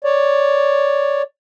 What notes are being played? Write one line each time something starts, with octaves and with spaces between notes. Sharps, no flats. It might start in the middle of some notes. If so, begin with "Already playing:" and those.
C#5 D5